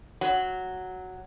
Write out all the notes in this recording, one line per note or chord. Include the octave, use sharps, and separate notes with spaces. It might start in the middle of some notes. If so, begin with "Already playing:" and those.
F#3